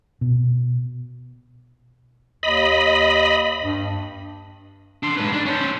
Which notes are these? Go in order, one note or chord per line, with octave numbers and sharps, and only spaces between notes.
B2
D#2 D#5 B5
G2
D4 C6
G#2 B4
D4
C#4 C5